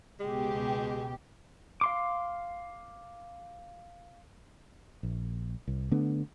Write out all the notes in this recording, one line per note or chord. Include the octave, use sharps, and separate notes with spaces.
C#2 B2 G#3 G4
F5 C6 D6
A#1
C2
D3 A3 B3 D4